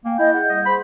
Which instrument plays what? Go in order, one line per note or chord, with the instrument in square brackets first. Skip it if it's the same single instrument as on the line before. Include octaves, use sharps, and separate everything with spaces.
[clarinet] A#3 [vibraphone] F5 G5 G#5
[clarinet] E4 [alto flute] D#5 [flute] G6
[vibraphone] G#4 D#5 E5 [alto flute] F#5
[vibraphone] G3 [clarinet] D#5
[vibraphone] G#4 C6 [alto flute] C5 [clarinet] B5